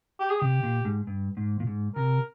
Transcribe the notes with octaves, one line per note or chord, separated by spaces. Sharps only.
G4
G#4
C3 G4
A#2
G#2
G2
G#2
A#2
G#2
C3 A#4